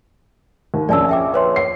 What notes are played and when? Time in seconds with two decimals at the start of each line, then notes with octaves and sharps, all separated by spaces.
0.74 D#2
0.89 A#1 F2 C#4 D5 A5 E6
1.09 E5 G5 D6
1.34 B4 C#5 C6
1.56 C7